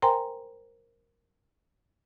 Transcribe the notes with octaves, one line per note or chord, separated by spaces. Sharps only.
A#4 C5 G5 G#5 A#5 C6